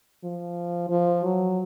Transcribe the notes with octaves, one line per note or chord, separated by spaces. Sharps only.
F3
F3
F#3